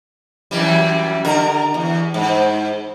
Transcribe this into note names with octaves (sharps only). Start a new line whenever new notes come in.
F#2 E3 G3
D3 A#4
E2
G#2